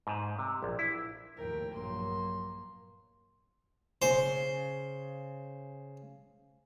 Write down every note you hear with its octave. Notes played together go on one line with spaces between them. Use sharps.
G#2
C3
A#1
E4
D#2 A2 F3 A#4 G5
A#1 G2 F#3 A#3 C6
C#3 C5